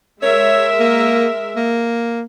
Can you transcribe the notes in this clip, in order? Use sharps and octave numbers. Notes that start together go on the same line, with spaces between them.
G#3 A#4 C#5 E5
A#3
A#3